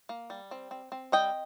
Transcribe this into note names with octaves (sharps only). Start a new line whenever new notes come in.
A#3
G3
C4
C4
C4
G3 D#5 G5